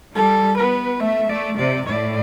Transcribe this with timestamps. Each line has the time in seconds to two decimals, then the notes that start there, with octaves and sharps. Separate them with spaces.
0.15 G3 A4
0.57 B3 B4
1.00 A3 E5
1.29 A3 D5
1.57 C3 D5
1.86 A2 D5